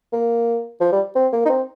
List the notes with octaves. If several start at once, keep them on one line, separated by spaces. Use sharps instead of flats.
A#3
F3
G3
C4
A#3
D#4
C4